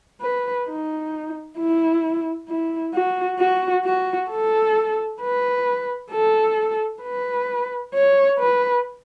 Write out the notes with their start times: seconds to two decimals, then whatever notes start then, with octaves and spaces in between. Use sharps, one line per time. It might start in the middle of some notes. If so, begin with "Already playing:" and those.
0.21 B4
0.68 D#4
1.58 E4
2.49 E4
2.94 F#4
3.39 F#4
3.85 F#4
4.30 A4
5.21 B4
6.11 A4
7.02 B4
7.94 C#5
8.39 B4